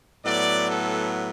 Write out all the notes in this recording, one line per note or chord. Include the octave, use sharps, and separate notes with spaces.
A2 F#3 B3 D5
A4